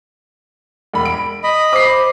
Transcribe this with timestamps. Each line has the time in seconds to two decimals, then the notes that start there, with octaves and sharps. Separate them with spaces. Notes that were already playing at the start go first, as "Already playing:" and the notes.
0.94 E1 B5
1.05 D7
1.44 D#5 B5
1.73 C5 D6 C7